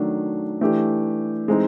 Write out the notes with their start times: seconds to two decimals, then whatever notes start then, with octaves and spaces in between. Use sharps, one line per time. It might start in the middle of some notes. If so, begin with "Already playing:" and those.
Already playing: D#3 F#3 A3 D4
0.61 E3 A3 D4 G4
1.48 E3 G#3 C4 D#4